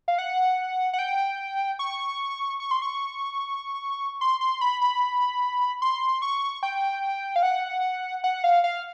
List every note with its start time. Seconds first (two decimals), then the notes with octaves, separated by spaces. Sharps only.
0.08 F5
0.18 F#5
0.93 F#5
0.99 G5
1.79 C#6
2.60 C#6
2.71 C6
2.82 C#6
4.21 C6
4.41 C6
4.61 B5
4.81 B5
5.82 C6
6.22 C#6
6.63 G5
7.36 F5
7.43 F#5
8.24 F#5
8.44 F5
8.64 F5